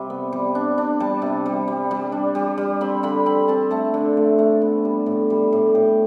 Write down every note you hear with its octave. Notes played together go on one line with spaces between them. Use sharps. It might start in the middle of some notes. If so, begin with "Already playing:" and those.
Already playing: C3 G3
B3
G3
D4
D4
G3 A5
C3
G3
G3
G3
D4
G3
G3
C4 B5
D3 B5
C4 B5
C4 A5
A3 A5
D3
A3
A3
B3
G3
A2
G3
A2
A2 G5